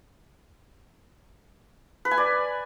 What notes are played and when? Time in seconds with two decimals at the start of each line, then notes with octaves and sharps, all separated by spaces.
2.05 B4
2.11 G#5
2.17 D5